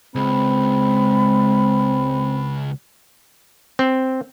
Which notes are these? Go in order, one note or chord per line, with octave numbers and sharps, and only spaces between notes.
C#2 G#3 C4 B5
C4